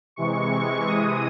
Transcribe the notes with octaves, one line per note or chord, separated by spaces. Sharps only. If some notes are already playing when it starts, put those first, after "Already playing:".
C3 E3 G#3 C#6
C3 E3 G#3 D#6